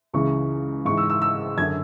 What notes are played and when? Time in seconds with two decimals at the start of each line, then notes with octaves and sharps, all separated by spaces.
0.13 C#2 C#3 E3 C#6
0.85 G#2 E3 C#6
0.97 E6
1.10 E6
1.22 E6
1.57 F#2 D3 G#6